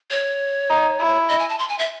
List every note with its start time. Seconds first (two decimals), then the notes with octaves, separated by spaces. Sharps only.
0.11 C#5
0.70 D#4
1.00 E4
1.29 D#5
1.39 G#5
1.49 A5
1.59 C6
1.69 G#5
1.79 E5